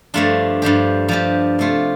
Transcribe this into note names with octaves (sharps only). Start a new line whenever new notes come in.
G2 F3 A3 D4 F4
G2 F3 D4 G4
G2 F3 D4 G4
C3 A3 F4